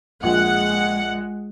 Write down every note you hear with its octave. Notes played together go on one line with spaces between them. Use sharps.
A#1 G#3 F#5